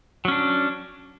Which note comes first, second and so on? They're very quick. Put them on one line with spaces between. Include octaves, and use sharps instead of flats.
F#3 C#4 D4